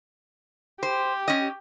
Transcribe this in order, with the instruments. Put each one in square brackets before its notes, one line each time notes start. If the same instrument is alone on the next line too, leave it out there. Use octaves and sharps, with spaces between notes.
[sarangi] G4 [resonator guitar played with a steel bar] C5
[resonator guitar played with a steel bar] C#4 D#5